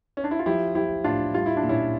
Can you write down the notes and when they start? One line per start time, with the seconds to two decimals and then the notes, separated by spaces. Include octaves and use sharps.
0.17 C#4
0.24 D4
0.31 E4
0.39 F4
0.46 F3 E4 G4
0.75 F3 E4 G4
1.04 A2 D4 F4
1.34 G3 F4
1.46 E4
1.57 D4
1.63 A#2
1.69 C#4 E4